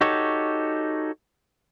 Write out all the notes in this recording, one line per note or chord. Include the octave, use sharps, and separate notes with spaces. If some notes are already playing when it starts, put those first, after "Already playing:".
D#4 F#4 G4 A4 C#5